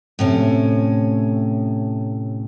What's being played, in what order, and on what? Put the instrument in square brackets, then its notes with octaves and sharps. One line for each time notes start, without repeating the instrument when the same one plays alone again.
[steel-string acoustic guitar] A2 C3 C#4